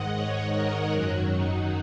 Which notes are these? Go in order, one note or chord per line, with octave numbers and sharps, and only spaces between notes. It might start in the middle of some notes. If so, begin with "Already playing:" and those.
Already playing: G#2 D#3 G#3 D#5 F#5
C#5
A#4
F#2 D#3 F#3 F#4
D#4